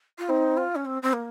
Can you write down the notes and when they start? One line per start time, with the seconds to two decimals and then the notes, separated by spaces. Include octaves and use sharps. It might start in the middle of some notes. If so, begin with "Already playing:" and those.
0.18 F4
0.29 C4 D#4
0.57 F4
0.75 C#4
0.85 C4
1.02 C4
1.13 A#3